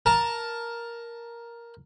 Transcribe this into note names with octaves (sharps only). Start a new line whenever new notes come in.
A#4 A5 A#5